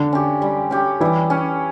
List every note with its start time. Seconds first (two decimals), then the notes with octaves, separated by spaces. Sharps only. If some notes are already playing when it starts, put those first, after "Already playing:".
Already playing: D3 D4
0.13 C#4 G4
0.42 G3
0.71 C#4 G4
1.00 E3 G3 E4
1.30 C#4 G4